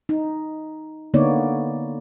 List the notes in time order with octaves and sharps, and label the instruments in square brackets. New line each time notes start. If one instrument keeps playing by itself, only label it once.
[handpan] D#4
D3 A#3 B3 D#4 C#5 D5